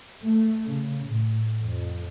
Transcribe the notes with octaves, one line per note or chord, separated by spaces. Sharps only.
A3
C#3
A2
F2